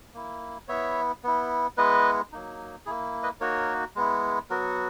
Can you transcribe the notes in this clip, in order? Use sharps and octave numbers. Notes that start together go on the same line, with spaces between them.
A#3 E4
B3 E4 C#5 E5
B3 E4
G#3 B3 E4 B4 D#5
F#3 A#3 D#4
A#3 E4 G#4
B4 D#5
A#3 D#4 F#4 A#4 C#5
G#3 B3 E4
F#3 B3 F#4 A#4